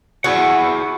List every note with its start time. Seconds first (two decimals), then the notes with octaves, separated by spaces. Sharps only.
0.24 E4 F#4 G#4 F#5